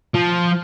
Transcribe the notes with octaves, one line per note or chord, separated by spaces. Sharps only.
F3